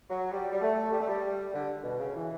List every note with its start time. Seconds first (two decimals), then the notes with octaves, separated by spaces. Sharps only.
0.10 F#3
0.32 G3
0.52 G3
0.62 A3
0.92 G3
1.00 A3
1.07 G3
1.53 D3
1.84 B2
2.00 C#3
2.15 E3